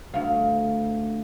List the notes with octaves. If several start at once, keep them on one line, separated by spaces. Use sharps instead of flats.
D2 F5